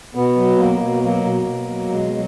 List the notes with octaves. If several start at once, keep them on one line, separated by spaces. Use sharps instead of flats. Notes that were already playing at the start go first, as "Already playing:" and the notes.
B2 B3
F#3
B2 A#3
B2
F#3 A#3
B2
B2
F#3
B2 G#3
F#3